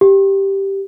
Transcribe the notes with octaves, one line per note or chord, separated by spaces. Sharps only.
G4